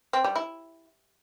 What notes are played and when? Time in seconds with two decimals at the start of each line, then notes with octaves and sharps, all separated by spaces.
0.13 C4
0.24 G3
0.36 E4